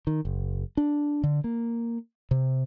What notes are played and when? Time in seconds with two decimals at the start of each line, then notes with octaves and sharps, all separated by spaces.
0.07 D#3
0.25 F#1
0.77 D4
1.23 D3
1.44 A#3
2.31 C3